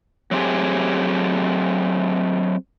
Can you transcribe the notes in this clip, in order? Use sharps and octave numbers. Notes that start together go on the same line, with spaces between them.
F#3 A3 C4 G4 G#4